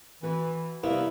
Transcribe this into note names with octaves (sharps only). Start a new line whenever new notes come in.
E3 F#4 B4
C2 A#3 B3 E4